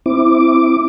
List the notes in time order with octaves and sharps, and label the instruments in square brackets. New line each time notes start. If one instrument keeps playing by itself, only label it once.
[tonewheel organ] C4 E4 D6